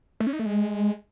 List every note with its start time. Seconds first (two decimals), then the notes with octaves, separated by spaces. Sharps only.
0.20 A3
0.27 C#4
0.33 D#4
0.39 A3
0.46 G#3